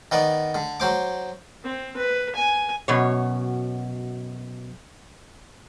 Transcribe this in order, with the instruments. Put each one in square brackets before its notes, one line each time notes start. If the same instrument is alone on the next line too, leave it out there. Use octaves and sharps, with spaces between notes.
[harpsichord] D#3 B3 D5
D3
F#3 C5 D6
[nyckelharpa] C4
B4
G#5
[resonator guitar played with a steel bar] F#2 B2 C#5